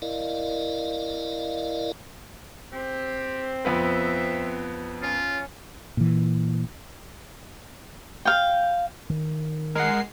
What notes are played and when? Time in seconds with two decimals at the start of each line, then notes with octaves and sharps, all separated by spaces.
0.02 E4 A#4 D5 D#5 F5
2.73 C4 G4
3.65 F2 B3 B4 E5
5.02 C#4 F4
5.97 A#2 E3
8.25 F5 G5
9.10 D#3
9.75 G#3 A#4 F#5 C7